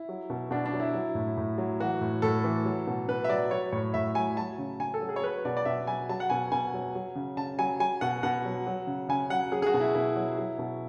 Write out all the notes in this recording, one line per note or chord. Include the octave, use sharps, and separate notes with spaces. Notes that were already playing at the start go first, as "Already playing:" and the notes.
Already playing: E4
F#3
B2
B2 D4
D4
F#3
E4
F#3
A2
A2
F#3
E3 F#4
A2
A2 A4
E3
F#3
B2
B2 B4
E5
F#3 D5
F#3 C#5
A2 C#5
A2 E5
F#3 G#5
F#3 A5
C#3
C#3 G#5
A4
F#3
G#4
C#5
F#3 B4
B2 D5
D5
B2 E5
F#3 G#5
F#3 A5
F#5
B2 G#5
B2 G#5
F#3
F#3
C#3
C#3 A5
F#3 G#5
F#3 G#5
B2 F#5
B2 F#5
F#3
F#3
C#3
C#3 G#5
F#3 F#5
F#3 G#4
G#4
F#4
B2
E4
B2 E4
F#3
F#3
B2